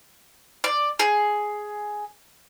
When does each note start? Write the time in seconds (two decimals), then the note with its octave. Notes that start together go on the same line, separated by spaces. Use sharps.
0.64 D5
0.99 G#4